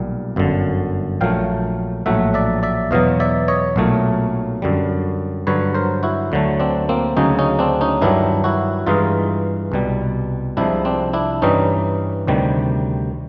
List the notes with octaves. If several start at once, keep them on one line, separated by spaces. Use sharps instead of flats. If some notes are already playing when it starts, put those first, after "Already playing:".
Already playing: B1 A#2 G3
G1 F#2 D3
A#1 A#2 F#3 A3 F5 G5
A#1 A2 F#3 A3 E5 F#5
D5 E5
D5 E5
E2 B2 F#3 D#5 F5
D5 E5
C#5 D#5
B1 A#2 F#3 A3
F#2 D3 G3
G2 D3 F#3 B4 C#5
A#4 C5
E4 F#4
D2 D3 F#3 A3
C4 D4
A#3 C4
D2 C#3 F#3 C#4 D#4
C#4 D#4
C4 D4
C#4 D#4
G2 D#3 F#3 D4 E4
E4 F#4
G2 E3 G#3 D#4 F4
C2 B2 G3
C2 C3 F3 G#3 D4 E4
C4 D4
D4 E4
G2 E3 G3 C#4 D#4
D2 C3 D#3 G3